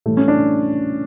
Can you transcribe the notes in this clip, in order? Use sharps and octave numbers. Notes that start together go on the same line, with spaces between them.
A2 E3 G3 A3
C#4
D4